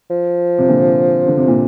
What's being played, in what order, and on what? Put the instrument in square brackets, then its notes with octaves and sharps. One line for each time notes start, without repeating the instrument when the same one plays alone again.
[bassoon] F3
[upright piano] C3
A#2 D3
D3
C3
A#2